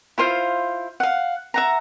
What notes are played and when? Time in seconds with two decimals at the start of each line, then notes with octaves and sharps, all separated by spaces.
0.18 E4 F4 C5 F5
1.00 F5 F#5
1.54 E5 F#5 A#5